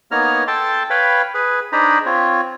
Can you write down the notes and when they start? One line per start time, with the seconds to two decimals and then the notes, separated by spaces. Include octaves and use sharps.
0.11 A#3 B3 D#4 C#5 A#5 F6
0.48 A4 G5 A5 C6
0.90 B4 C#5 F5 G5 B5
1.34 G#4 B4
1.73 D4 D#4 G#4 C5 A#5 B5
2.06 C4 F4 C#5